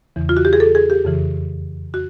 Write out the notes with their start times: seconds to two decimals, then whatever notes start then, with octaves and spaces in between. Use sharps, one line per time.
0.16 E2 C#3 E3
0.29 F4
0.37 F#4
0.45 G4
0.53 G#4
0.60 A4
0.75 G#4
0.90 G4
1.05 F2 C#3 E3
1.94 F#4